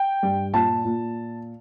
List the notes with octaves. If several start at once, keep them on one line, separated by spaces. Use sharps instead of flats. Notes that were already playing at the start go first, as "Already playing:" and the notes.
Already playing: G5
G2
A#2 A5
A#2